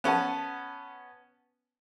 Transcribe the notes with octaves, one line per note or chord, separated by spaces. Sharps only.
B3 C#4 F#5 A5